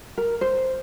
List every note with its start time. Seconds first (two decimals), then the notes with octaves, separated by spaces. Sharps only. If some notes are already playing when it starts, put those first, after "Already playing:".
0.18 A#4
0.41 C5